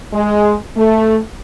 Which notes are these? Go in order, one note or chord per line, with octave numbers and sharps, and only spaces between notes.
G#3
A3